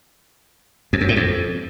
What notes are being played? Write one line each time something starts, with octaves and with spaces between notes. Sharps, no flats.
F2
F#2
A2
F2